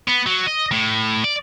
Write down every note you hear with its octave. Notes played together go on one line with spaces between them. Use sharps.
B3
F#3
D#5
A2
D5